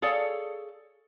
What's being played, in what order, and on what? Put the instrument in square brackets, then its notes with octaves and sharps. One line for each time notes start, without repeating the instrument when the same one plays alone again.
[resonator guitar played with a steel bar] G#4 A4 C#5 D5 F5